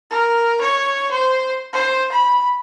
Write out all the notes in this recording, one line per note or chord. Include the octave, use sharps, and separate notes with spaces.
A#4
C#5
C5
C5
B5